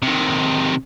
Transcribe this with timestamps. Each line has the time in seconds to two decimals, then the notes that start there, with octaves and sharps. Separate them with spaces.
0.02 C3 D#3